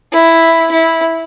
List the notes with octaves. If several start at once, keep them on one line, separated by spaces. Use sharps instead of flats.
E4
E4